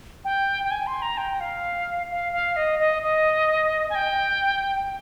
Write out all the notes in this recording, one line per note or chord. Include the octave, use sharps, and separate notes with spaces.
G5
G5
G#5
C6
A#5
G5
F5
F5
F5
D#5
D#5
D#5
G#5
G5